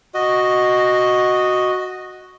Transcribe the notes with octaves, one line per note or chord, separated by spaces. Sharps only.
F#4 D#5